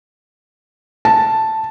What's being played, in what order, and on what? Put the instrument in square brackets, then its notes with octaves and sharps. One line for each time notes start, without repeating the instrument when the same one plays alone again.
[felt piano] A5